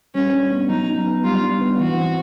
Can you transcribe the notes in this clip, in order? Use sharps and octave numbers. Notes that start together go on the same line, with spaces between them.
G3 C#4
D4
B3
F#3 D#4
D#4
B3
G3 F4
D4
B3
E3 F#4
C4